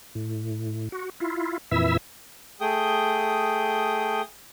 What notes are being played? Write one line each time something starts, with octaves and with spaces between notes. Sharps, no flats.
A2
F#4
E4 F4
F2 A#2 E3 E4 E5 E6
A3 G#4 G5 D#6